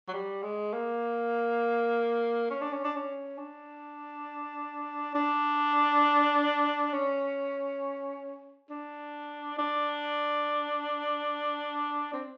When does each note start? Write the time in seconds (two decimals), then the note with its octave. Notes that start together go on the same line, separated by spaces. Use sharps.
0.08 F#3
0.14 G3
0.43 G#3
0.74 A#3
2.50 C#4
2.61 D4
2.73 C#4
2.85 D4
2.96 C#4
3.38 D4
5.15 D4
6.93 C#4
8.70 D4
9.58 D4
12.13 C4